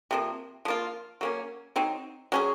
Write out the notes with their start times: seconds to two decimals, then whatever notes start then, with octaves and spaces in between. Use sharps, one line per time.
0.11 C3 F3 A#3
0.65 F3 A#3 F4
1.21 F#3 A#3 C#4
1.76 F#3 C4 D#4
2.32 F#3 C#4 G#4